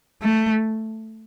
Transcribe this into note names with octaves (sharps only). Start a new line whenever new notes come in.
A3